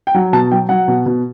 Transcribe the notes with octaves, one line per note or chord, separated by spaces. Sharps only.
G5
F#3 F#5
B2 A5
F#3 G5
F#3 F#5
B2
B2